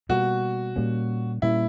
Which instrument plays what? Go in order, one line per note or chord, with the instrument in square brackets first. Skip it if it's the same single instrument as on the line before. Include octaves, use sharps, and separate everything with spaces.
[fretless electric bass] B2 G3 A#3 [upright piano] F#4
[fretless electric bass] A#2 G3 A#3 C#4
[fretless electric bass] A#2 G3 A#3 C#4 [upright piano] E4